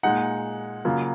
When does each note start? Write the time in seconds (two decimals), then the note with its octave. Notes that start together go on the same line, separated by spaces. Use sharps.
0.03 A#2 G#3 D#4 F#5
0.85 C#3 F#3 A#3 F4